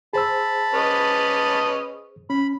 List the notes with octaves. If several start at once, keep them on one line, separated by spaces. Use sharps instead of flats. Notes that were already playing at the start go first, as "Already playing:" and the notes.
G#4 C5 A5 B5 E6
C#4 B4 D#5
C#4 B5